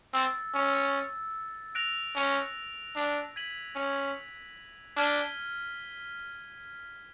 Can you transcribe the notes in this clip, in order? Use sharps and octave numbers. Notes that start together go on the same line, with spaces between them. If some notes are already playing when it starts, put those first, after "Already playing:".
C4 E6 A6 C#7
C#4
F#6 A#6 D7 F7
C#4
D4
G#6 B6 D#7 F#7
C#4
D4 F6 G#6 B6 D#7 G7